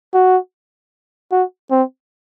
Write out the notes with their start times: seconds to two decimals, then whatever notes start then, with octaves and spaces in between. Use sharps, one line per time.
0.14 F#4
1.32 F#4
1.71 C4